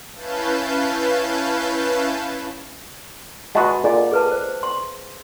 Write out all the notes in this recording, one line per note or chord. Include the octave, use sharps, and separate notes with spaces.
C#4 E4 B4 F5 A5 G6
G#3 F#4 B4 D#5 F#5 A5
A#2 G#4 D#5
G#4 B4 A5
C5
C6